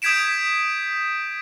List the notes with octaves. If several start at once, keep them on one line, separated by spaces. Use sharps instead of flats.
D#6 G6 G#6 B6 D7 E7